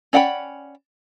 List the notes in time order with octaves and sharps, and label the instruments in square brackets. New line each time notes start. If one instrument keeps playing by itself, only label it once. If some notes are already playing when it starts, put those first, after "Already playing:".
[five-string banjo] C#4 D5 F#5 G5 B5